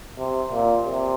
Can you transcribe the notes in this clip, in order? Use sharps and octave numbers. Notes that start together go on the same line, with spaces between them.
C3
A#2
C3